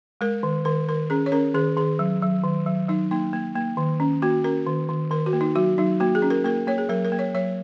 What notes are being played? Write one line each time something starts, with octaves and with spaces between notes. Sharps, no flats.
G#3 A#4
D#3
D#3 A#4
D#3 A#4
C#4 G#4
C#5
C#4 A#4
D#3 G#4
D#3 G#4
F#3
F#3
D#3
F#3
F#3 D#4
A#3 D#4
A#3
A#3
D#3
C#4
A#3 F#4
C#4 A#4
D#3
D#3
D#3 A#4
F#4
A#3
D#4
F#3 F#4
F#3 D#4
A#3 F#4
G#4
C#4
A#4
A#3 A#4
A#3 C#5
G#4
F#3 A#4
A#4
A#3
C#5
F#3 C#5